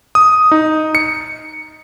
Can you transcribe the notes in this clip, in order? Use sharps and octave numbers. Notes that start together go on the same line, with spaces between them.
D#6
D#4
C#7